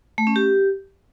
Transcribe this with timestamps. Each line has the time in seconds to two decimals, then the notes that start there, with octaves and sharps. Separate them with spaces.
0.18 A3
0.27 C#4
0.36 G4